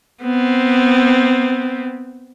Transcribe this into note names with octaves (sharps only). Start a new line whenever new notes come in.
B3 C4